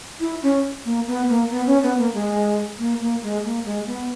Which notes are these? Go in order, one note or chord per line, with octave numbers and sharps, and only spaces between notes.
E4
C#4
A#3
B3
A#3
B3
C#4
B3
A#3
G#3
A#3
A#3
G#3
A#3
G#3
B3